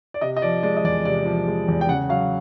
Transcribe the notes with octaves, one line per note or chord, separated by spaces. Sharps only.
D5
C3 D#5
D#5
F3 D5
G#3 D5
D#5
E2 D5
C3 D5
F3
G#3
E2
G5
C#3 F#5
F#3 F5